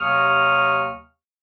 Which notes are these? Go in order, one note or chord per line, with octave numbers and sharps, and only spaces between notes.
D#2 C3 F#3 C#6 D#6 F6